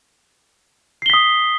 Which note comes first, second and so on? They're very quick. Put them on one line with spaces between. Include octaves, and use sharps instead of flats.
C7 G7 B6 D#6